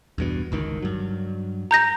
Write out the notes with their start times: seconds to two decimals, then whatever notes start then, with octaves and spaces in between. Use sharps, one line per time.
0.18 E2 G2 B2
0.52 G1 C#2 D#3
0.82 G2 F#3
1.71 A#5 G6 A#6